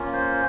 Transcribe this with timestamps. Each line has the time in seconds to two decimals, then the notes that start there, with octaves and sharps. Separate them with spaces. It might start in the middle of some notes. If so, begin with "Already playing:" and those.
Already playing: A#3 C#4 F4
0.13 C5